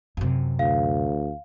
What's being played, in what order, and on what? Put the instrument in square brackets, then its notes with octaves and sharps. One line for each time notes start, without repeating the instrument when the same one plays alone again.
[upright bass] F#2 C3
[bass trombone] D2 [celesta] F5